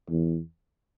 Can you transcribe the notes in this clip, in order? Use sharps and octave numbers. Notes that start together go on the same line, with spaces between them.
E2